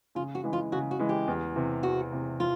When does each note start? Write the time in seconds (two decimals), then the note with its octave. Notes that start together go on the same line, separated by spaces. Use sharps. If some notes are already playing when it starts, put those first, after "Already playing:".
0.15 C#3 F4
0.35 F#4
0.44 E3 G#3
0.53 F4
0.72 C#3 F#4
0.91 F#4
0.99 E3 G#3
1.09 G4
1.28 E2
1.56 C3 E3
1.83 E2 F#4
2.12 C3 E3
2.40 F4